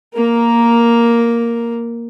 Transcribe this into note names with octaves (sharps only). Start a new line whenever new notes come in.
A#3 A#4